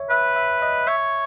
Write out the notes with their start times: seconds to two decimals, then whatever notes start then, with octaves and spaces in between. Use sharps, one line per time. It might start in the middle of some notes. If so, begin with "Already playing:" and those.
Already playing: C#5 E5
0.10 B4 E5
0.36 E5
0.62 D#5
0.87 C#5 E5